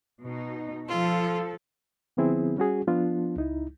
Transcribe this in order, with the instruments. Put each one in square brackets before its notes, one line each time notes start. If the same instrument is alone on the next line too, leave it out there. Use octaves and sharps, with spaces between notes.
[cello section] B2 D#4
[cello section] F3 A4 [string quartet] F4
[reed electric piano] D3 F3 B3 C4 E4 G#4
G3 C#4 F#4 G#4
F3 B3 D4 F4
C#2 D#4 E4